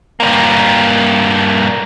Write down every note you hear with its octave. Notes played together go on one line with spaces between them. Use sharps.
G2 A#3